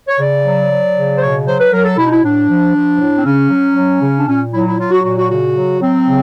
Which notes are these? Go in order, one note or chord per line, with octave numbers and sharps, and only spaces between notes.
C#5
C#3 D5
F#3
F#3
C#3
C5
B2 C#5
F#3 C5
B4
F#3 A#4
A4
B2 E4
D#4
E4
A2 D4
F3
F3
A2
C4
C#3 C#4
F#3
F#3
C#3
D4
A#2 C#4
F#3 E4
E4
F#3 F4
F#4
A#2 F#4
F#4
C#3 F#4
F#3
F#3 C4
C#3